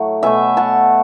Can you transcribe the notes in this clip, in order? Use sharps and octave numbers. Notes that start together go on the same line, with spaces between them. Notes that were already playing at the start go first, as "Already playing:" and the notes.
Already playing: A2 F#3 A3 F#5
B2 A3 E5 G#5
F#5 A5